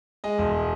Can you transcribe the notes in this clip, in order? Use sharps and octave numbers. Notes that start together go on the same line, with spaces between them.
G#3 D#5
E1